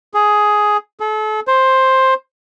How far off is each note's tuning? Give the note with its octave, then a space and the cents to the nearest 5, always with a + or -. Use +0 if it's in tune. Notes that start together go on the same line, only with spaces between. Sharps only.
G#4 +10
A4 -35
C5 +10